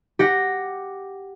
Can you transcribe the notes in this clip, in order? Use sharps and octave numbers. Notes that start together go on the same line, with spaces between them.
G4 F#5 A#6